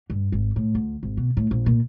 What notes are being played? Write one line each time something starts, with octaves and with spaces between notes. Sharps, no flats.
G2
G#1
A2
D2
G#1
B2
A2
A#1
A#2